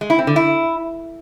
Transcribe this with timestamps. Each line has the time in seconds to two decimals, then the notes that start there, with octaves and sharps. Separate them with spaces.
0.01 G#3
0.10 E4
0.19 C4
0.27 D3
0.36 E4